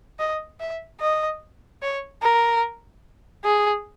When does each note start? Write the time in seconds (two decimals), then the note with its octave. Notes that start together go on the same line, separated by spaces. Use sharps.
0.19 D#5
0.60 E5
1.01 D#5
1.82 C#5
2.22 A#4
3.45 G#4